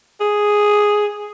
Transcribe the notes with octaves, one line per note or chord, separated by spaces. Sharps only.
G#4